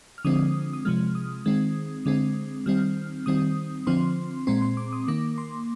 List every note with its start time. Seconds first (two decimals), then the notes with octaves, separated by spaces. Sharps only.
0.18 F6
0.25 D3 F3 G#3 C4 D#6
0.73 D#6
0.85 C3 F3 G#3 F6
1.15 D#6
1.45 D#3 G#3 C4
2.06 D3 G#3 C4
2.66 D#3 G3 C4 F6
3.26 D#3 G3 C4 D#6
3.87 D3 F3 C4 C6
4.47 A#2 G#3 C4 C6
4.62 C6
4.77 D6
4.93 D#6
5.08 D#3 A#3 D6
5.38 C6